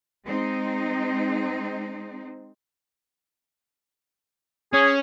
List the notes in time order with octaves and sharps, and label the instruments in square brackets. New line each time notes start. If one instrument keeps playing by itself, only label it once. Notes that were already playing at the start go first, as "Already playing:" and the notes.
[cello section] G#3 C4 D#4
[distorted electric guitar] C#4 [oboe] G#4